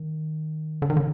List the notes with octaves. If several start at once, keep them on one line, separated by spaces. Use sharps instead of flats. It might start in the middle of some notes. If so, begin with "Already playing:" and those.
Already playing: D#3
D3
D#3
D3